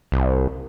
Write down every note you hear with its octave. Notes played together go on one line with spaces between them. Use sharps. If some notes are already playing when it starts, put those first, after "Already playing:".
C2